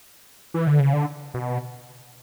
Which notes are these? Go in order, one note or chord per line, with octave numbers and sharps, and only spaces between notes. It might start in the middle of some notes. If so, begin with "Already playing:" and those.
E3
D3
C#3
D3
B2